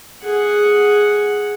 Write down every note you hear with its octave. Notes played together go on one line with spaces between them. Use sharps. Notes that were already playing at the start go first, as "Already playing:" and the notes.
G#4 F#5